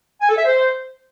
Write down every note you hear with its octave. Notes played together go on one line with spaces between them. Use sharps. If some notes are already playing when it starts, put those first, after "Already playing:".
G#5
A4
E5
C5